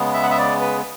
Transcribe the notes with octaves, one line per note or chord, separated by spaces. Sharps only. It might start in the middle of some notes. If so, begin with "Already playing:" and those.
Already playing: C#3 G#3 B3
E5
F#5
E5
D5
B4